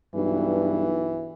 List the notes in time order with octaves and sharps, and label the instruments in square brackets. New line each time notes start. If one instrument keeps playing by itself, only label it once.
[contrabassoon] B1 [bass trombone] G2 [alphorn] E3